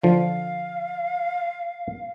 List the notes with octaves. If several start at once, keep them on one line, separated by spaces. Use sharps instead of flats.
D3 F3 F5